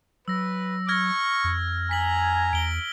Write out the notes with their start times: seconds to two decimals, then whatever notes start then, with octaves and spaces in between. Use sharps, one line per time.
0.28 F#3 B4 E6 A#6
0.89 C#6 F6 G#6 A#6
1.44 F2
1.91 G#5 A#5 B6 F#7
2.53 E2 D7 G7